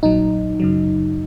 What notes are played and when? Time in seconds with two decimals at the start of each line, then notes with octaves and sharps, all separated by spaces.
0.03 A#1 A#2 F#3 D#4
0.60 F#2 C#3 F#3